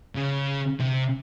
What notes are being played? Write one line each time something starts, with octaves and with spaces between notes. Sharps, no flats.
C#3
C3